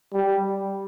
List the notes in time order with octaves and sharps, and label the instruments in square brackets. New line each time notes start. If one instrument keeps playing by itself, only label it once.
[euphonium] G3